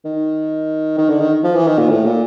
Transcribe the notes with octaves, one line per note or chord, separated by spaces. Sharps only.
D#3
D#3
D3
D#3
F3
E3
D#3
A#2
A2
A#2